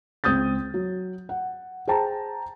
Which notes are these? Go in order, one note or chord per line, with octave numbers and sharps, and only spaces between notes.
C#2 C4 D#6 G6 A6
F#3
F#5
G#4 C5 G5 A5 A#5